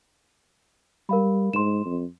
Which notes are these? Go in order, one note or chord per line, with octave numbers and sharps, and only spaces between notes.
G3 A#4 F5 B5
G#2 C6 E7
F2